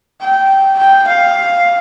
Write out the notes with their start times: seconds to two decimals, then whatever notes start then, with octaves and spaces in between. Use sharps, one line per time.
0.21 G5
0.78 G5
1.07 F5